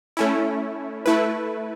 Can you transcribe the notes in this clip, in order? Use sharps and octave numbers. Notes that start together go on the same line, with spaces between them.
A3 C#4 E4
A3 E4 B4